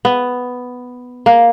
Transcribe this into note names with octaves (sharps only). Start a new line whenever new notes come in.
B3
A#3